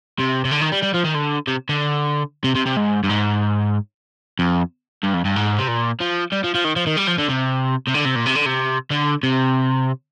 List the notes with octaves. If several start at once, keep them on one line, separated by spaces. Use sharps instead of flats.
C3
C3
D3
D#3
G3
G3
F3
D#3
D3
C3
D3
C3
C3
C3
G#2
G2
G#2
F2
G2
F2
G2
G#2
C3
A#2
F3
G3
F3
F3
D#3
F3
D#3
G3
F3
D3
C3
C3
D3
C3
A#2
C3
D3
C3
D3
C3